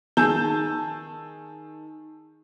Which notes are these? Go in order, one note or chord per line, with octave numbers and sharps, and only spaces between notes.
D#3 G#4 A5 E6 G6